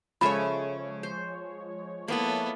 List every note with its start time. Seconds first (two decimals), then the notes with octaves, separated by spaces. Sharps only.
0.21 C#3 F3 G#3 A4 C#5 E5 B5
1.03 C5
2.08 A#3 B3 E4 A4 B4